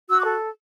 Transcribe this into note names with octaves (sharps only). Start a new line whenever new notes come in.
F#4 E6
D6
A4